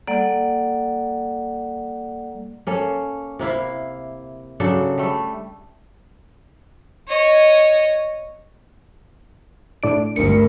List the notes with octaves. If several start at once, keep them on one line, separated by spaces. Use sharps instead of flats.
G3 A#3 A4 D5 F#5
A#3 C#4 A4
C3 A#3 E4 F5
C#3 F#3 D4 A4
G3 A3
C#5 D#5
A2 D4 D7
G#1 D2 G2 A#4 C#7